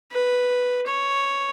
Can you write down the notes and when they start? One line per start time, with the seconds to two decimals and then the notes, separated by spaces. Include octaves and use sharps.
0.12 B4
0.86 C#5